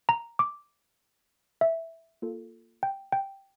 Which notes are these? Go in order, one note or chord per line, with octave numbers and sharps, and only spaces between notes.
A#5
D6
E5
A#3 F4 A4
G5
G5